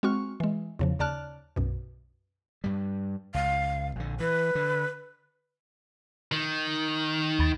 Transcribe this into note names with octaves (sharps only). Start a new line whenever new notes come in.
G#3 C4 F#4 C#6 F6
E3 G#3
E2 C#3 F3
D#2 C#3 D5 A5 F6 F#6
B1 F#2 B2
G2 G3
C#2 F5
A#1 D3
E3 B4
D3
D#3
D#2 B5 A6